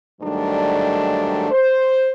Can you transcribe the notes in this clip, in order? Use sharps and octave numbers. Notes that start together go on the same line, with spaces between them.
G#2 D#3 F#3 G3 A3 D4
C5